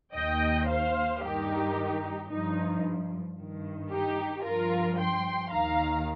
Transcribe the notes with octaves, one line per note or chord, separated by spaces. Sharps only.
D#2 D#3 D#5 G5
C5 F5
G2 D#3 D#4 G4
G2 F3 D#4
G2 D#3
D#4 G4
G2 F3 F4 A#4
G5 C6
D#2 D#3 F5 A#5